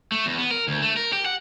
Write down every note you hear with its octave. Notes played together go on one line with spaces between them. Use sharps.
A3
E2
B3
A#4
D2
A3
A#4
G4
F#5